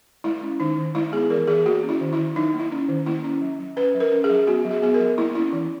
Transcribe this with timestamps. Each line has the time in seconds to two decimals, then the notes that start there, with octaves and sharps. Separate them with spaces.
0.24 G#3 E4
0.42 C#4
0.60 D#3 D#4
0.78 D#3
0.95 G#3 E4
1.13 B3 G#4
1.30 E3 A#4
1.47 E3 G#4
1.66 A#3 F#4
1.83 C#4
1.89 E4
2.01 D#3
2.13 E4
2.18 D#3
2.35 F#3 D#4
2.54 A#3
2.60 E4
2.72 C#4
2.89 D#3
3.06 A#3 E4
3.24 C#4
3.41 F#3
3.59 F#3
3.76 C#4 B4
3.95 F#3
4.00 A#4
4.12 C#4
4.24 G#4
4.30 F#3
4.47 B3 F#4
4.65 F#3
4.71 G#4
4.82 B3 G#4
4.94 A#4
5.00 F#3
5.18 A#3 E4
5.35 C#4 E4
5.53 E3